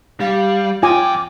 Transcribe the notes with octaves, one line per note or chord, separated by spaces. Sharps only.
G3 F5
F2 F4 G5 G#5 D6